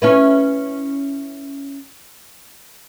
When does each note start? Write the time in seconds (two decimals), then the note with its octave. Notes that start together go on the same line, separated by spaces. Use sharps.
0.02 C#4 E4 B4